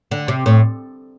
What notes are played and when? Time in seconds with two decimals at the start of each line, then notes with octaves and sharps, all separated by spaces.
0.11 D3
0.28 C3
0.46 A2